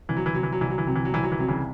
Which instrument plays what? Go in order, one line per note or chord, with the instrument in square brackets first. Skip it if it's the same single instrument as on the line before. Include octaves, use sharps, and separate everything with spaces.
[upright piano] C2 [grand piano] E3
[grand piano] F#3
E3
[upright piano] C3 [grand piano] F#3
[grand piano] E3
F#3
[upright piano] C2 [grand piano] E3
[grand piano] F#3
E3
[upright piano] C3 [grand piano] F#3
[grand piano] E3
F#3
[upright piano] C2 [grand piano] E3
[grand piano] F#3
E3
[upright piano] C3 [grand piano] F#3
[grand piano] C#3 E3